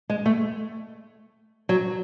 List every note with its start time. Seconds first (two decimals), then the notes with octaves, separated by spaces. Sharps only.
0.09 G#3
0.26 A3
1.69 F#3